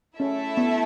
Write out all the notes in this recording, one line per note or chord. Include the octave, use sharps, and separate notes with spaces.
A3 C#4 E4 A4 E5
B3